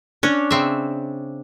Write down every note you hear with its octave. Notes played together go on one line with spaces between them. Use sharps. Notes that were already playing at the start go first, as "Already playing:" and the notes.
C#4 D4 C#5
C#3 C4 E5